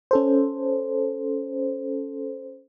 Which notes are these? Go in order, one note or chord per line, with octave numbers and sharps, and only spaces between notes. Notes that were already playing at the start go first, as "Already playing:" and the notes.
C#4 A4 C5